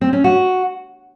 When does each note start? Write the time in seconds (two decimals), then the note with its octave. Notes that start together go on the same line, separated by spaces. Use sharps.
0.01 C4
0.13 C#4
0.24 F#4